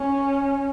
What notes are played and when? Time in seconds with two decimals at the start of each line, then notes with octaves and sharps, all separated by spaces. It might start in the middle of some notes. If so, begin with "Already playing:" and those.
Already playing: C#4